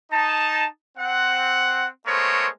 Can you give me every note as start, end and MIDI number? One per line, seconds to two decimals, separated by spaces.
0.12 0.65 63
0.12 0.65 81
0.98 1.88 60
0.98 1.88 78
2.06 2.47 56
2.06 2.47 57
2.06 2.47 59
2.06 2.47 70
2.06 2.47 72
2.06 2.47 73